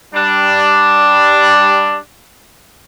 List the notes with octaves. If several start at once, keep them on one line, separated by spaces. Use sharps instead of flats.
G3 D4